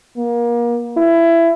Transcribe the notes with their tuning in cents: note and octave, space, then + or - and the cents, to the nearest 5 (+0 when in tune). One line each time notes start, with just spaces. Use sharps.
A#3 +30
E4 +20